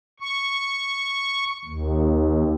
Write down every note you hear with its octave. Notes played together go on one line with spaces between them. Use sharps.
C#6
D#2